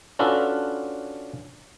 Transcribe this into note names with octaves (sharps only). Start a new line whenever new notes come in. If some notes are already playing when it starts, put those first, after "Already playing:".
C#4 D4 F4 F#4 A4 B4